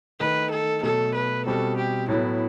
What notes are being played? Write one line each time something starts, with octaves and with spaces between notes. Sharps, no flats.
D#3 A3 D#4 B4
A4
B2 F#3 A3 A4
B4
B2 G3 C4 F#4 A4
G4
A2 F#3 B3 E4 F#4